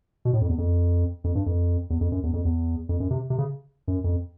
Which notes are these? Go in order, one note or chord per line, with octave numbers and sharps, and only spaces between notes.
B2
A2
F2
E2
F2
F2
G2
F2
E2
F2
F#2
E2
F2
E2
F2
F#2
C3
C3
C#3
F#2
F2